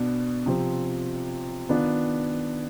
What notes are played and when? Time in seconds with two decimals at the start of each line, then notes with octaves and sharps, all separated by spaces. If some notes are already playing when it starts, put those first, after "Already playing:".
Already playing: B2 B3 D4
0.46 C3 F3 C4
1.69 D#3 B3 D4 F4